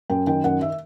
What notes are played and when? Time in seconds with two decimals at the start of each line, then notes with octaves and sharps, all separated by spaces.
0.10 F#2 G5
0.27 D#3 G5
0.44 F#2 F#5
0.62 E5